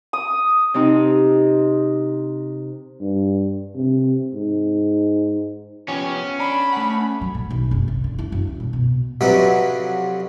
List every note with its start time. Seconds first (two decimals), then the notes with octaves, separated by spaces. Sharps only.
0.13 D#6
0.74 C3 C4 D#4
3.01 G2
3.76 C3
4.35 G#2
5.88 F3 B3 C#4 G4
6.39 D4 B5
6.73 A3 F#5
7.21 F#3
7.34 A#2
7.50 B1
7.71 F#1
7.88 C3
8.04 D3
8.18 E4
8.32 F#2
8.47 C2
8.60 A#2
8.73 B2
9.21 F2 C3 F#3 D4 G4 B4